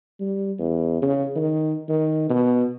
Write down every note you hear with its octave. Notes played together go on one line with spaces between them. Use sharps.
G3
E2
C#3
D#3
D#3
B2